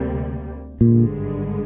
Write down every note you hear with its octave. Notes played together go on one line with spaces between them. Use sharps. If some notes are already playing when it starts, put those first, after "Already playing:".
Already playing: D2 C3 G3 A#3
G#1 G2 A#2 D3 G#3